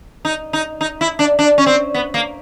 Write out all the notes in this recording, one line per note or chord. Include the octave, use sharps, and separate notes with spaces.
D#4
D#4
D#4
E4
D4
D4
C#4
C4
B3
A#3